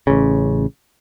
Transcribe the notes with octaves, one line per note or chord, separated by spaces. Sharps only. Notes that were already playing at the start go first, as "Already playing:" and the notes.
A1 C#3